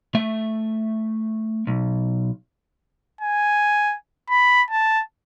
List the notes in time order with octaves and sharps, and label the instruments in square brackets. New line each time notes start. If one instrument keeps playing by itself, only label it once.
[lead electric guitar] A3 E5
B1
[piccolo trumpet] G#5
B5
A5